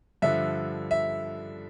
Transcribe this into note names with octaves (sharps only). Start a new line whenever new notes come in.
G2 D3 F3 E5
E5